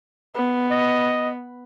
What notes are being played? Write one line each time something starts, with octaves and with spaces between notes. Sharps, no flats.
B3
D#5